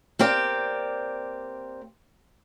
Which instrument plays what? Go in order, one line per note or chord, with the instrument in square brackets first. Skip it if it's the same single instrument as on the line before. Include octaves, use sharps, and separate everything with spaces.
[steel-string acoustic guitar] A#3 C4 G4 D5